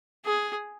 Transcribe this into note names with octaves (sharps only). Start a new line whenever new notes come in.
G#4